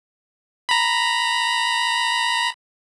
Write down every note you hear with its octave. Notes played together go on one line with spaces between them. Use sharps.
A#5 B5